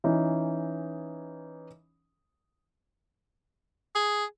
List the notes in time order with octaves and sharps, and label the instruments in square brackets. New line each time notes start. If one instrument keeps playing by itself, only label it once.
[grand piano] E3 C#4 D#4
[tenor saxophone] G#4